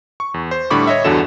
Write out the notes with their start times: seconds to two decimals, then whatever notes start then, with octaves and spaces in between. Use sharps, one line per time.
0.20 C#6
0.34 E2
0.51 C5
0.70 A2 D3 G3 B5 C#6 D6
0.87 C#5 D#5 E5
1.04 E2 G2 D3 F#4 A4 E7